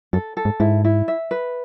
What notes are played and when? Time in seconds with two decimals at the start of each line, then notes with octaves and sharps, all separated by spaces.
0.13 F#2 A4
0.37 A4
0.45 G#2
0.60 G#2 E4
0.84 E4
1.08 E5
1.31 B4